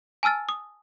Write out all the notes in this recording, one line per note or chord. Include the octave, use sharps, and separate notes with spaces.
G#5 A5 E6 F6 A6
D#6